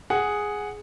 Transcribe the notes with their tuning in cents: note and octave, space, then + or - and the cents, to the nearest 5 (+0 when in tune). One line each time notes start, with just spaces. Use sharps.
G#4 +0 F#5 +0